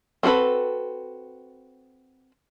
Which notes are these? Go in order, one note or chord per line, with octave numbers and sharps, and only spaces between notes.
C4 F#4 G#4 A4 B4